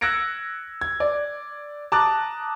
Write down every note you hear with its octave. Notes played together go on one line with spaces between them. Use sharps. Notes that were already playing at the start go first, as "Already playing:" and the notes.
E6 F#6 G#6 A#6 C#7 D7
G#6
D5
A5 A#5 D6 D#6 F#6 A6